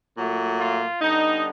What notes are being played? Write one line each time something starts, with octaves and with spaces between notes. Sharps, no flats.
A#2 F#3 A3
F4
D3 G3 B3 D#4